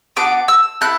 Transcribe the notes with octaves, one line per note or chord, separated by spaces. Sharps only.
B3 D4 F#4 D6
E6
E4 A4 F#6